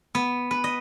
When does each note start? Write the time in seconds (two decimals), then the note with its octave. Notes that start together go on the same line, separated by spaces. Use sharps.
0.15 B3
0.51 B4
0.64 D#5